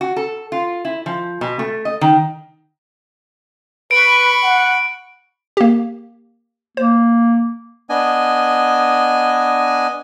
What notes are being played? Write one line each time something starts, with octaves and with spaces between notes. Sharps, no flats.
F#4
A4
F4
E4
F3
B2
A3
D#5
D#3
B4 B5 C#6 D7
F#5
A#3 G4
A#3 C5
B3 D4 D#5 G#5